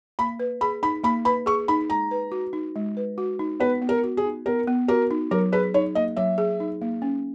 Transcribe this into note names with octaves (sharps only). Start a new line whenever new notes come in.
A#3 B5
B4
G#4 B5
D#4 B5
A#3 B5
B4 B5
G#4 C#6
D#4 B5
G#3 A#5
B4
F#4
D#4
G#3
B4
F#4
D#4
B3 B4
B3
A#4
F#4
G#4
D#4
B3 A#4
B3
F#4 A#4
D#4
F#3 A#4
G#4 B4
D#4 C#5
A#3 D#5
F#3 E5
G#4
D#4
A#3
C#4